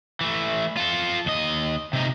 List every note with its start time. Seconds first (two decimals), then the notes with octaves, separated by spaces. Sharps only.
0.21 E3 A3
0.77 F4 A4
1.26 D#2 D#5
1.93 C3 D#4